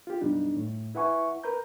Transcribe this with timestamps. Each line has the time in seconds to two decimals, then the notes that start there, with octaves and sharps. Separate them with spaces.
0.07 F4 G4
0.21 F#2 B2 G3 D4 D#4
0.56 A2
0.95 E4 B4 E5 F#5 G#5 C#6
1.44 A#4 B4 A#5 G6